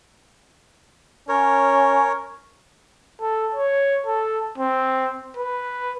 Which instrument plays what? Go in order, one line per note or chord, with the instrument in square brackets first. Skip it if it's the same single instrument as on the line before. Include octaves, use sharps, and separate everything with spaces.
[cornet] C#4 [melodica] A#4 C#5
[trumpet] A4
C#5
A4
C4
B4